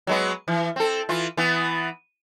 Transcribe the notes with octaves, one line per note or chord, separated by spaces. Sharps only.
F#3 G#3 B3
E3
C4 A4
E3 F4
E3 B3